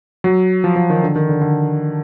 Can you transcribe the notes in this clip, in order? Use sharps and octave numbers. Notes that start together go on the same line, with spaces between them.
F#3
F3
F3
D#3
D3
D#3
D3
D3